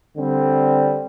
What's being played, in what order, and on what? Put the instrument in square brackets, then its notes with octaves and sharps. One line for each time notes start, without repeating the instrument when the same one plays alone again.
[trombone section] D3 G3 C4